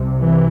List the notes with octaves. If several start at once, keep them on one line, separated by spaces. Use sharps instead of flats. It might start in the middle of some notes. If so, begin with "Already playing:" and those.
Already playing: C2 C3
E3